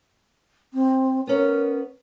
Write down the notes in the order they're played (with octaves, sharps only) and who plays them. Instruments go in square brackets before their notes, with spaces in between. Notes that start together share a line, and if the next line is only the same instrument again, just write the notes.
[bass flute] C4
[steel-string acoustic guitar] B3 C#4 [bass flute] A#4